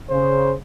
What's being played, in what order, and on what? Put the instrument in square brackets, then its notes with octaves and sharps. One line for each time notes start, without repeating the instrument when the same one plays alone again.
[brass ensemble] C#3 [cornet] C5